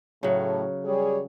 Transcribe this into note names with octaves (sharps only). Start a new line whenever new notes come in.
A2 C#3 F#3
G3 G#4 C#5